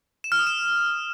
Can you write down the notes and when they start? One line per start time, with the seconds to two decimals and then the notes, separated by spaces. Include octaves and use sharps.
0.24 E7
0.32 F6
0.39 D#6
0.47 E7